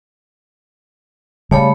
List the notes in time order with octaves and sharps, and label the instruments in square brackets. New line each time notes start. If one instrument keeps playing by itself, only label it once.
[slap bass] C#3 G3 [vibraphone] A3 C#5 B5